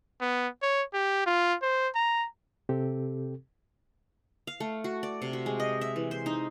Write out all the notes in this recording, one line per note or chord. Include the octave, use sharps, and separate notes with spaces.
B3
C#5
G4
F4
C5
A#5
C3 C4 G4 A4
F5
A3
F#4
D5
C3
F#4
G#3
D#5
E5
E3
C5
D#4